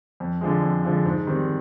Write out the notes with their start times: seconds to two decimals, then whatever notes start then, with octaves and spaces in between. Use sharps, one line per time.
0.20 F2
0.41 D3 F3 G#3
0.62 F2
0.84 D3 F3 G#3
1.05 G#2
1.27 D#3 G3 C4